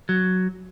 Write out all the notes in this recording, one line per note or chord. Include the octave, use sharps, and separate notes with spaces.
F#3